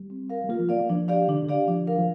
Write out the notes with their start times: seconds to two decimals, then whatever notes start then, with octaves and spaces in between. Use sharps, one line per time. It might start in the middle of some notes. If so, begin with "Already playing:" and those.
Already playing: G3
0.10 C4
0.30 A#4 F5
0.44 G3
0.49 A#3 F4
0.59 F3
0.69 A#3 D5 F5
0.80 A#3
0.90 F3 D4
1.08 G4 D5 F5
1.28 D3 D4
1.43 D3
1.49 G4 D5 F5
1.68 F3 D4
1.87 A#4 F5
1.98 F3